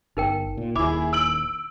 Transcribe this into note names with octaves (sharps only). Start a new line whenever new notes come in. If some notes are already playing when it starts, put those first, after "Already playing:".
G1 D#4 A#4 G5
A#2
D#1 D#2 E4 G#4 B5 D6
E6 D7 F#7